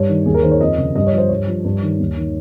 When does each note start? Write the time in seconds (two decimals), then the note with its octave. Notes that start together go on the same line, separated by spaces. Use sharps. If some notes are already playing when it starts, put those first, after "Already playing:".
Already playing: G2 C#5
0.09 D#3
0.26 D#2 G#4
0.34 A#4
0.43 D#3 C5
0.52 C#5
0.60 F2 D#5
0.78 C#3 F3
0.95 G2 D#5
1.07 C#5
1.13 F3
1.18 C5
1.29 G2 C#5
1.47 F3
1.65 G2
1.82 D#3
1.99 D#2
2.17 D#3